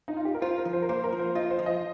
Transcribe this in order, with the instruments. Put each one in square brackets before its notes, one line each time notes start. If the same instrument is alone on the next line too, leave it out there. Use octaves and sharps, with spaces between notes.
[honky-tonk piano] D#4
F4
G4
A#4
[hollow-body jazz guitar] F4 [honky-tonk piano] C5
[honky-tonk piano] A#4
[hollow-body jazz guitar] F3
[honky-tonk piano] C5
A#4
[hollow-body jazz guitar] A#3 [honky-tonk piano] C5
[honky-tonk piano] A#4
[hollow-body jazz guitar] F3
[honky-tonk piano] C5
[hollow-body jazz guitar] F4 [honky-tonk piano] D#5
[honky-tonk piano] C5
[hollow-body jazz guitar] F3
[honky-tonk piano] D#5